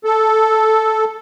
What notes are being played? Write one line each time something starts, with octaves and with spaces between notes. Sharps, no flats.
A4